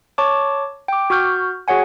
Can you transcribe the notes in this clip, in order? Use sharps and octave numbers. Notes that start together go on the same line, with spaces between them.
C#5 A5 C#6 D6
G5 D6
F#4 C#6 F6 G6
F#4 G#4 C#5 F#5 G#5